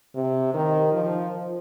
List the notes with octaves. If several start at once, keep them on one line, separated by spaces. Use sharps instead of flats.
C3
D#3
F3